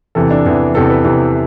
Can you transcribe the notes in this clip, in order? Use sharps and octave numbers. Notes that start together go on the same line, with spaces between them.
E2 C3 E3 A4
D4
E2 C3 E3
E2 C3 E3 A4
B4
E2 C3 E3